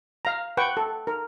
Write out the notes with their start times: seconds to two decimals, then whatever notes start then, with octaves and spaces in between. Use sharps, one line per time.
0.25 F5 A#5
0.57 B4 F#5 G5 C#6
0.77 A4
1.07 A#4